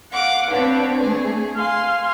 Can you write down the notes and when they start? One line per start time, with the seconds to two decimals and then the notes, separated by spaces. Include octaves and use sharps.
0.11 F5 F#5 D6
0.49 C4 D4 B4 C#5
1.01 A3 G#4
1.56 F5 G#5 C6